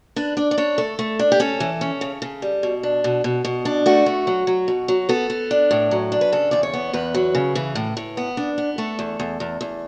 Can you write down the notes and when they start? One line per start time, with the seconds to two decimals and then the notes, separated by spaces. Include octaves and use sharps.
0.16 D4 B4
0.37 D4 D5
0.51 D5
0.58 D4 C#5
0.78 A3 A4
0.99 A3
1.19 D4
1.32 G4
1.40 C#4 A4
1.60 E3
1.81 C#4
2.01 C#3
2.22 C#3
2.42 G3
2.63 B2
2.83 D4
3.04 B2
3.24 B2
3.45 B2
3.65 D4
3.86 A3 F#4
4.06 A3
4.27 F#3
4.47 F#3
4.68 B2
4.88 F#3
5.09 B3 A4
5.30 B3
5.51 D4
5.71 A2
5.91 F#3
6.12 D4
6.21 B4
6.32 C#3 A4
6.51 E2 D5
6.63 C#5
6.74 B3
6.93 E2 B4
7.14 F#3
7.35 C#3
7.55 E3
7.75 A2
7.97 A2
8.17 B3
8.37 D4
8.58 B3
8.78 A3 A4
8.99 E2
9.20 E2
9.40 E2
9.61 E2